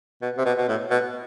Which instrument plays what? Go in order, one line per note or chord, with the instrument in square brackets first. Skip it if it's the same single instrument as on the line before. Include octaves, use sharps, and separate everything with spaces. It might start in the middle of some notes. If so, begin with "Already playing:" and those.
[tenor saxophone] B2
C3
B2
B2
A2
B2